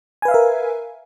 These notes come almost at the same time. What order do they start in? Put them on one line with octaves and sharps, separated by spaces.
G#5 B4 F5 E5 A#4